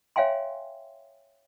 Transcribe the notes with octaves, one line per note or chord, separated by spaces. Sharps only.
C#5 E5 F5 G5 G#5 C6